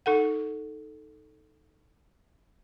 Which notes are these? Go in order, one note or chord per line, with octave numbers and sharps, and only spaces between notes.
D#4 A4 F#5